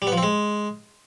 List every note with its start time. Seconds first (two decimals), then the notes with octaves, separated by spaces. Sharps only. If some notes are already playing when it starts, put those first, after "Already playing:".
0.02 G3
0.07 B3
0.12 F3
0.18 C4
0.23 G#3